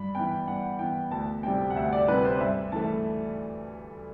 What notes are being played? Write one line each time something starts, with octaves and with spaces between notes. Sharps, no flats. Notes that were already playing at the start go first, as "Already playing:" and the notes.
Already playing: G2 B5
E3 B3 G5
G2 F#5
E3 B3 G5
D2 A5
C3 G3 C4 G5
F#5
D2 E5
D5
C3 G3 C4 B4
C5
G2 E5
E3 A3 A5